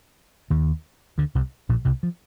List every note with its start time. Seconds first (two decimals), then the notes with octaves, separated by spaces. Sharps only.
0.50 D#2 D#3
1.18 D2 D3
1.35 C2 C3
1.69 A#1 A#2
1.85 C2 C3
2.03 F3